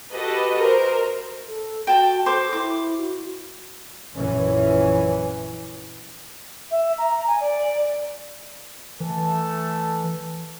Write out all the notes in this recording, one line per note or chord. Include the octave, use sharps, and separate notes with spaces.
F#4 G4 A4 B4 D#5
A#4 C5
A4
F#4 G5 A5
A4 C5 D6
E4 D6
F#4
A#1 F#2 E3 C#4
E5
A#5
G#5
D5
E3 A3 A4 A5